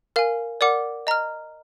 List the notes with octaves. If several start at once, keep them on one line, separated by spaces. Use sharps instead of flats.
A#4 F5 G#5
A#4 D5 F#5 D6
D#5 A#5 F6